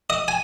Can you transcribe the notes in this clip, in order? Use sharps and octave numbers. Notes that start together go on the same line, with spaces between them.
D#5
G#5